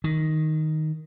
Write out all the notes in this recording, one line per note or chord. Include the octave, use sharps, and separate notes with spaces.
D#3